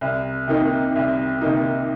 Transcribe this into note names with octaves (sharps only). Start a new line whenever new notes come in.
C2
C3 D#3 A#3 D#4
C2
C3 D#3 A#3 D#4